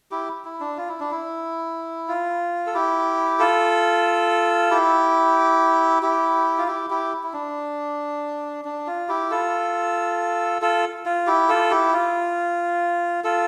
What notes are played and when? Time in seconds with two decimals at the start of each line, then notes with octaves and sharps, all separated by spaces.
0.11 E4 G4
0.45 E4
0.60 D4
0.77 F4
0.89 E4
1.00 D4
1.11 E4
2.08 F4
2.67 A4
2.74 E4 G4
3.40 F4 A4
4.71 E4 G4
6.03 E4 G4
6.58 F4
6.68 E4 G4
6.90 E4 G4
7.23 E4
7.33 D4
8.65 D4
8.87 F4
9.09 E4 G4
9.30 F4 A4
10.62 F4 A4
11.06 F4
11.27 E4 G4
11.49 F4 A4
11.71 E4 G4
11.93 F4
13.24 F4 A4